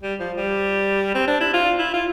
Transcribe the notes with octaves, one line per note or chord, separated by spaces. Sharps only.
G3
F3
G3
C4
D4
E4
F4
E4
F4